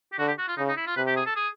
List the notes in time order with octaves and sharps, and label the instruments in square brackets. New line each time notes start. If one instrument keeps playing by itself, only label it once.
[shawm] G4
[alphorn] D3 [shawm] F#4
[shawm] G4
F#4
F4
[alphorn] C#3 [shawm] D#4
[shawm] D#4
E4
F4
[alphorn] C3 [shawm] B4
[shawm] G4
G#4
A4
G#4